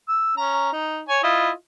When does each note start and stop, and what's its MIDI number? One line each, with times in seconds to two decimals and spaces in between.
0.08 0.33 88
0.37 0.72 61
0.37 0.72 82
0.72 1.02 63
1.09 1.19 73
1.09 1.19 80
1.24 1.51 64
1.24 1.51 65
1.24 1.51 75